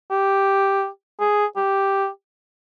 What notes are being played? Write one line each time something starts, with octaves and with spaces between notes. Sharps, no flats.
G4
G#4
G4